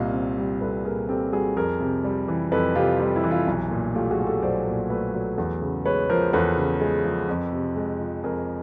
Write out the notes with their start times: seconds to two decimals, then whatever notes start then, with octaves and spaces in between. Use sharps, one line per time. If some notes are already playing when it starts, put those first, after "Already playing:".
Already playing: C2 A#2 D#5 F5
0.13 C4
0.38 G3
0.61 C2 A4 B4
0.85 A#2 G#4 A#4
1.09 C4 G4 A4
1.32 G3 F#4 G#4
1.56 F2 G#4 A#4
1.80 C3
2.04 G3
2.28 E3
2.51 F2 A4 B4
2.75 C3 F4 G4
2.99 G3 F4
3.16 E4
3.24 E3
3.31 F4
3.47 B1
3.71 A#2
3.95 A3 F4 G4
4.11 F#4 G#4
4.18 F#3
4.27 G4 A4
4.42 B1 C5 D5
4.67 A#2
4.90 A3 A4 B4
5.14 F#3
5.38 E2
5.61 C#3
5.85 G#3 B4 C#5
6.09 F3 A#4 C5
6.33 E2 A4 B4
6.57 C#3
6.81 G#3
7.05 F3
7.29 F2
7.52 C3
7.76 G#3
8.00 F3
8.24 F2 G#4 A#4